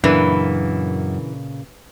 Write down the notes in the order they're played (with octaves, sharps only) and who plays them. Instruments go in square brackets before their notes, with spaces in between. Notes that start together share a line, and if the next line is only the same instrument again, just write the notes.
[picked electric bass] F#2 [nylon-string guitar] A#2 C#3 A#3 [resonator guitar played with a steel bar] E3 [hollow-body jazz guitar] D4 B4